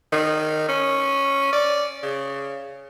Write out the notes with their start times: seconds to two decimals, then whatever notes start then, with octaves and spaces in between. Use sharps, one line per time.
0.13 D#3
0.68 C#4
1.53 D5
2.03 C#3